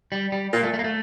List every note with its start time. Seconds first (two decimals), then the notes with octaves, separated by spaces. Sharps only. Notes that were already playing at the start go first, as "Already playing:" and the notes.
0.12 G3
0.32 G3
0.53 A#2 A#3
0.63 A3
0.74 A3
0.79 A#3
0.84 A3